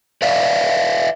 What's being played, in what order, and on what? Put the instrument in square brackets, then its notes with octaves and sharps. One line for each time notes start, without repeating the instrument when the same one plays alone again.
[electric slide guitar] B4 D5 E5 F5